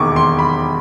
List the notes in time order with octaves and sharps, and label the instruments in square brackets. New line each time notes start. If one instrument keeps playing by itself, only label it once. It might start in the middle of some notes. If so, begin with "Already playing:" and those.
Already playing: [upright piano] E1 D#2 D#3 [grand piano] C#6 D6
[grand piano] C6
B5